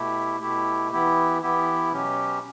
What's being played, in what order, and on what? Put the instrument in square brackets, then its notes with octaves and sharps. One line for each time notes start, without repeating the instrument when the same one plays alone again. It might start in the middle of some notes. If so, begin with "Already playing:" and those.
Already playing: [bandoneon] B2 A3 E4 G4
B2 A3 E4 G4
E3 B3 E4 G4
E3 B3 E4 G4
B2 F#3 C#4 G4